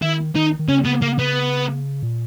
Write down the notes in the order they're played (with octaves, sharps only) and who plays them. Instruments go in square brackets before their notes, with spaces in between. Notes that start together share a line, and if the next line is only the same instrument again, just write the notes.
[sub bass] D#3 [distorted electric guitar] E4
[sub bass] D#3 [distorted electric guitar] D#4
[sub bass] D#3
[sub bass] C#3 [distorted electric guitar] C#4
[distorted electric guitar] B3
A#3
B3
[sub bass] A#2